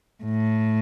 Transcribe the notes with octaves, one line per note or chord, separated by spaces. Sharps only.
A2